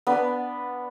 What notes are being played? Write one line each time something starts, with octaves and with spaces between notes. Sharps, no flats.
B3 D4 B4